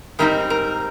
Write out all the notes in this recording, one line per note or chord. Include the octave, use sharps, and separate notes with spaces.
G#2 G3 C4 D#4 A#4
A#4